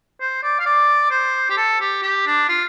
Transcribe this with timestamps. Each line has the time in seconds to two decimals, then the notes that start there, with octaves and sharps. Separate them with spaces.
0.20 C5
0.43 D5
0.59 F5
0.66 D5
1.10 C5
1.50 G4
1.57 A4
1.80 G4
2.02 G4
2.26 D4
2.48 F4